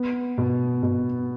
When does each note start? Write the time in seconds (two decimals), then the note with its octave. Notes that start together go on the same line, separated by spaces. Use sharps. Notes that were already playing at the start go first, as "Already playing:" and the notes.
Already playing: B3
0.38 B2
0.83 B2